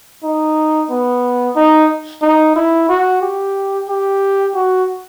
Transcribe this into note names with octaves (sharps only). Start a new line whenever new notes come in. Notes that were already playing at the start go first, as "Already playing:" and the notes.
D#4
B3
D#4
D#4
E4
F#4
G4
G4
F#4